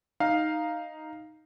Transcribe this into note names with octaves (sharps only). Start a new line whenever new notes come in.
D#4 F5